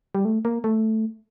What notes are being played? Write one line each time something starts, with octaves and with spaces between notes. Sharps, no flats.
G3
A3
A#3
A3